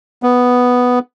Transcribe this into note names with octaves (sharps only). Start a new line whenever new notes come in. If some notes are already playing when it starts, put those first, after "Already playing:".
B3